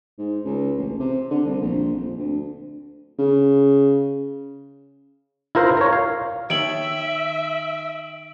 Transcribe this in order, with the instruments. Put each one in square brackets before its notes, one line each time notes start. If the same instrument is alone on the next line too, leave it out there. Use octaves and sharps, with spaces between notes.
[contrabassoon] G#2
C#2
A1
C3
D3
C2
A#1
F2
D2
C#3
[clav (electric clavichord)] E4 F4 A#4 C5
A#4 C#5
F5
[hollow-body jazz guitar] D#3 C#5 G5 [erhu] E5 [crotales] D7 F#7